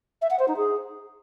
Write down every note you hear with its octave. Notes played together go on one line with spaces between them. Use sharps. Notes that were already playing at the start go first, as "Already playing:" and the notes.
E5
F#5
C5
D#4
G#4